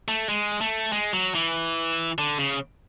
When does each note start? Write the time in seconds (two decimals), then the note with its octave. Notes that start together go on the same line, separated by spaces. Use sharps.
0.08 A3
0.29 G#3
0.61 A3
0.92 G#3
1.13 F#3
1.35 E3
2.18 D3
2.38 C#3